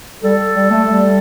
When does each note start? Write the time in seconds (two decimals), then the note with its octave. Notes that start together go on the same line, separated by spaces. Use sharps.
0.23 G3 A4
0.55 G3
0.71 A3
0.87 G3